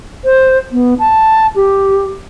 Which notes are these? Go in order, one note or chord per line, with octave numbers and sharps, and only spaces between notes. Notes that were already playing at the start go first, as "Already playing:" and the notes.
C5
B3
A5
G4